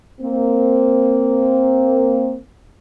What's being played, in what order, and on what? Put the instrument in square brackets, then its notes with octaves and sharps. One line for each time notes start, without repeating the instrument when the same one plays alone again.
[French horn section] A#3 C4